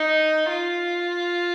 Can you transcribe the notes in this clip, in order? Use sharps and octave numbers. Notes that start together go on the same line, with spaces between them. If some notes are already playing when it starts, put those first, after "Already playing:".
Already playing: D#4
F4